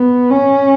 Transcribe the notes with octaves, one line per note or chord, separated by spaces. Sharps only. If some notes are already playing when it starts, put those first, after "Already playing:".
Already playing: B3
C#4